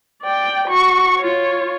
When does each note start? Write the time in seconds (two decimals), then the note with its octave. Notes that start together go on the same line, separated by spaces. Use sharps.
0.22 D5 G5
0.68 F#4 C#6
1.18 F4 C#5